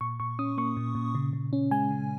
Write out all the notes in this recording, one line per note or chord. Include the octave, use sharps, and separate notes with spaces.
A#2 C#6
A#2 C#6
C#4 D#6
A#3 C#6
A#2
A#2
C#3
C#3
C#4
G#3 G#5
C#3